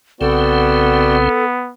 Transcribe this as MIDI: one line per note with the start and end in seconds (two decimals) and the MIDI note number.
0.21 1.29 35
0.21 1.29 49
0.21 1.72 59
0.21 1.29 60
0.21 1.17 66
0.21 1.45 69
0.21 1.17 74
0.21 1.17 79